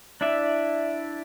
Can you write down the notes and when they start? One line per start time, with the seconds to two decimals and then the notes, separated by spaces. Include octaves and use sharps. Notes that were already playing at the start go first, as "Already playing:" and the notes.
0.21 D4 E4 D5 E5